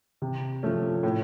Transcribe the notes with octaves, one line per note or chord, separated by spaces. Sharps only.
C3
F3 A3 C#4
A2